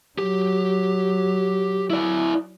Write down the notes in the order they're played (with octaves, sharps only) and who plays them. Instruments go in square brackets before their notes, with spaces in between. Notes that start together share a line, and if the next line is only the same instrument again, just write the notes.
[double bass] F#3 [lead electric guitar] G4
[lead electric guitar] E4 D5